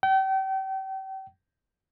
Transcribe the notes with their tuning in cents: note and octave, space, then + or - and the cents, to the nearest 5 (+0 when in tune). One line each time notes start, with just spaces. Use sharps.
G5 -35